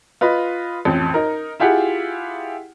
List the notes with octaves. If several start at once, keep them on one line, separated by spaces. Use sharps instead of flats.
F4 B4 D#5
A1 F2
D#4 A#4
E4 F4 G4 G#4 F#5